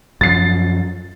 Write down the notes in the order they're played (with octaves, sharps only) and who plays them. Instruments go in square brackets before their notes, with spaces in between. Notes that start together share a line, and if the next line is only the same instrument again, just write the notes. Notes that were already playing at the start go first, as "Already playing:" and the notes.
[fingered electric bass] F#2 F3 [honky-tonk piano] A6 C7